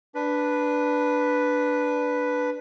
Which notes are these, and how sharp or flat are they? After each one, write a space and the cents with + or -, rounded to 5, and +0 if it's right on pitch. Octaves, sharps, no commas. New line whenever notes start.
D4 -5 B4 +0